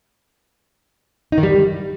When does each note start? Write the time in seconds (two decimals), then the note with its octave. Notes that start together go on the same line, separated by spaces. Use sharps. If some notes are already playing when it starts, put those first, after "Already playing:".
1.32 D#4
1.38 D#3
1.43 G3